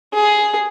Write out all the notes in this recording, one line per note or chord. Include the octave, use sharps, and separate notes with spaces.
G#4